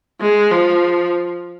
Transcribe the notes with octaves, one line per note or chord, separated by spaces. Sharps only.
G#3
F3